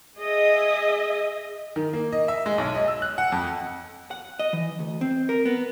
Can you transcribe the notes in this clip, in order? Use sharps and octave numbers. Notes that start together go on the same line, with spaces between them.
G#4 D#5 E5
D#3
A#3
D#5
E5
G#3
B1
D#5
E6
F#6
F#5
F2
F#5
D#5
E3
D2
C4
A#4
B3